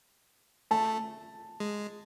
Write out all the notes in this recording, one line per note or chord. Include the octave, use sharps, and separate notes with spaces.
A3 A5
G#3